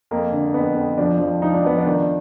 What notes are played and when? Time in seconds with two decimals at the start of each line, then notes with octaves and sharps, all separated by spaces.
0.11 F2 A#3
0.32 D3
0.54 F2 B3
0.76 F2
0.98 F3 D4
1.20 F3
1.42 F3 D#4
1.54 D4
1.65 F3 B3
1.79 D4
1.86 D#3